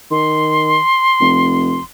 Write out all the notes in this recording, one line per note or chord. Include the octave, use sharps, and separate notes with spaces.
D#3 C6
F1